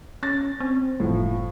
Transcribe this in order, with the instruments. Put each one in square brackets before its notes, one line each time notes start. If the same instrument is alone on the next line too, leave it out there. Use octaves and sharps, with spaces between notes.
[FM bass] C#4 [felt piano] A6 A#6
[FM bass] C4
[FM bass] F#1 [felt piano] A2 F3